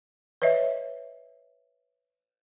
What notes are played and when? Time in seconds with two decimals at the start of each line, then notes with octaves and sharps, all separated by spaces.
0.42 B4 C#5 D#5 E5